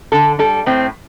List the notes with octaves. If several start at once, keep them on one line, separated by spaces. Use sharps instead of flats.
D3 A4
G3 A4
A2 C4